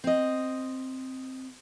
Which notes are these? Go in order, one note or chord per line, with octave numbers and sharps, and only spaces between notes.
C4 D#5